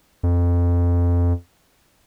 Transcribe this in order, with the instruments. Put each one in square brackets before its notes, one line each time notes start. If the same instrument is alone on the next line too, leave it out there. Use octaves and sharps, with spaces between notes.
[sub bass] F2